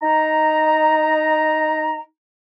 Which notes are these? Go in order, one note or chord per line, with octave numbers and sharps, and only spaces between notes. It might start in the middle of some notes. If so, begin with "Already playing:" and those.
D#4 A#5